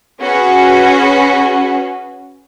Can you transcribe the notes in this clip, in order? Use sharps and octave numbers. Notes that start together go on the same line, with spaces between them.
C#4 F#4 G#4 B4